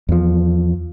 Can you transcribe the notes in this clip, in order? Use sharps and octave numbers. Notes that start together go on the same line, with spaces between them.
E2 F3